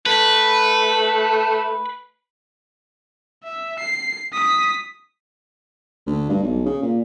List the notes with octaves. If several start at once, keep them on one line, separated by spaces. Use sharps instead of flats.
A3 B4
E5
C7
D#6 B6
D2
G2
B1
C#3
A#2